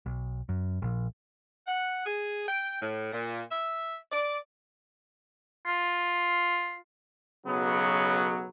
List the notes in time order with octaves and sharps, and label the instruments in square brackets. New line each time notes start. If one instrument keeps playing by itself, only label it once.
[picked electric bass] B1
F#2
A#1
[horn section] F#5
G#4
G5
A2
A#2
E5
D5
[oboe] F4
[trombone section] B1 C#3 F#3 B3